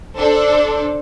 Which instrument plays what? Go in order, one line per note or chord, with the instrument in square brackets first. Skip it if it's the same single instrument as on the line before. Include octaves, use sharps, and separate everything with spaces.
[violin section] D4 A4 C5